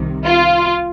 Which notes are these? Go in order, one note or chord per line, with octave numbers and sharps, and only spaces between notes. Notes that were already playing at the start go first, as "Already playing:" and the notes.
Already playing: C2 C3 D#3
F4